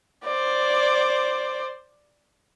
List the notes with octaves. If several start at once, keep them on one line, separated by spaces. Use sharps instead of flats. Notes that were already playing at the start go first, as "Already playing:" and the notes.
C5 D5